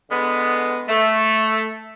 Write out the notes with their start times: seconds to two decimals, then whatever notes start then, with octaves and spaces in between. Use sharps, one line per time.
0.10 D3 G#3 B3
0.88 A3